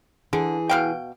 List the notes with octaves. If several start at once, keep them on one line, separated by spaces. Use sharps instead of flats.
D3 E3 G#4
B2 F5 G5